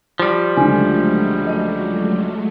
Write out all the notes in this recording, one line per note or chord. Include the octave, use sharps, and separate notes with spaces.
F3 G3
C#2 D3 F#3 G#3 A3 G#5
D#5 A5